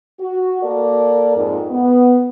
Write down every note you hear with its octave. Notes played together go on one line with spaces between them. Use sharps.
F#4
A#3 A4 A#4 D5
F2 G#2
B3